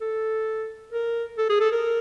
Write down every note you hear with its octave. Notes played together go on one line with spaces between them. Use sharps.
A4
A#4
A4
G#4
A4
A#4